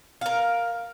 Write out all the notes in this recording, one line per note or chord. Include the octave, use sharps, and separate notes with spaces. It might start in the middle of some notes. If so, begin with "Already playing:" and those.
A#4 F5